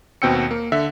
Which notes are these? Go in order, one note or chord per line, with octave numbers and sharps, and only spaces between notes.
D#2 B2 C4 G5 E6 C#7
A#3
D3 E5